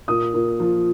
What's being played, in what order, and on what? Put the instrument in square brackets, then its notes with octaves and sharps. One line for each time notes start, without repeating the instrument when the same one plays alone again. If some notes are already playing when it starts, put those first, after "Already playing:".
[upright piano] A#2 D#6
A#2
F3